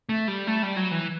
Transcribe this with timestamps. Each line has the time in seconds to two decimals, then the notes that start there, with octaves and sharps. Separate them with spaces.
0.09 A3
0.28 G3
0.47 A3
0.63 G3
0.76 F#3
0.91 E3